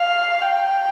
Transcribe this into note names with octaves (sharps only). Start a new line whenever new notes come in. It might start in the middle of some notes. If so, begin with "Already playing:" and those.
Already playing: F5
G5